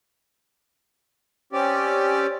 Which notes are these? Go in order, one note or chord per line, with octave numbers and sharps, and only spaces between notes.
C4 C#4 G4 D5